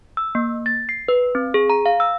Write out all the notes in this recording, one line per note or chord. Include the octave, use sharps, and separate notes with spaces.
E6
A#3
A6
C7
B4
C4
G#4
A#5
F5
E6